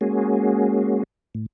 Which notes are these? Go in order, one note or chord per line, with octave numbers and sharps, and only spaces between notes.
G#3 A#3 C#4 F#4 G#4
A2